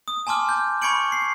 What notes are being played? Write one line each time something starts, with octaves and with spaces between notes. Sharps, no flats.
D#6
G#5 A5 C6 D6 F6
G6
B5 C#6 G#6 C#7 D7 F#7
C7